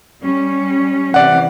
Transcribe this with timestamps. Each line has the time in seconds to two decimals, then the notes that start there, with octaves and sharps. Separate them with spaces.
0.23 G3 C#4
1.14 C3 E3 D5 F#5